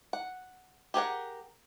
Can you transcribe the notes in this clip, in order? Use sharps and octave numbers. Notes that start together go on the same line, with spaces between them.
F#5
G4 G#4 A#4 F#5